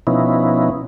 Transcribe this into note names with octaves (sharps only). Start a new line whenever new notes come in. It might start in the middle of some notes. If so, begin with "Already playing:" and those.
B2 F3 B3 C#4 D#4 E4